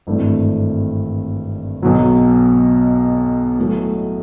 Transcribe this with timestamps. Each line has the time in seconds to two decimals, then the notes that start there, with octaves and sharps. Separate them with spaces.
0.07 G#1 G2 E3 A3 C4
1.82 B1 B2 F#3
3.58 A2 F#3 A3